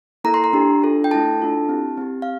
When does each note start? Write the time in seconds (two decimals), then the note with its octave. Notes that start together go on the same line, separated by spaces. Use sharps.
0.24 A#3 E4 A4 A#5
0.34 C6
0.44 A#5
0.53 D4 G4
0.82 D4 F4 A4
1.04 G5
1.11 A3 E4 A4 A5
1.40 D4 F4 A4
1.69 C4 E4 G4
1.97 C4 G4
2.22 F5